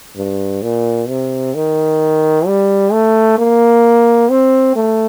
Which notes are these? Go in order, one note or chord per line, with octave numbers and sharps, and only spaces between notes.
G2
A#2
C3
D#3
G3
A3
A#3
C4
A3